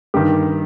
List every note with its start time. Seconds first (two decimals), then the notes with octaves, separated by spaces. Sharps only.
0.14 G2 D#3 G4